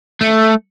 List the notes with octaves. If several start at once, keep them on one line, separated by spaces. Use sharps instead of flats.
A3